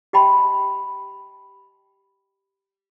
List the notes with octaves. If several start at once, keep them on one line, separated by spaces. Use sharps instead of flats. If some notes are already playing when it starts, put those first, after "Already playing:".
G4 D#5 G5 A5 B5 C6